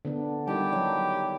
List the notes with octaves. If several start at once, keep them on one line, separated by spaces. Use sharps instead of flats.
D3 B3 D4
D#3 G3 E4 G4 A5
F#3